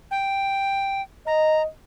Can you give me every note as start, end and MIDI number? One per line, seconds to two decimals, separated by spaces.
0.11 1.01 79
1.27 1.65 75
1.27 1.62 82